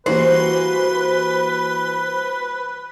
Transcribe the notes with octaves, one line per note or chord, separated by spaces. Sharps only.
E3 G3 A#3 F#4 B4 C5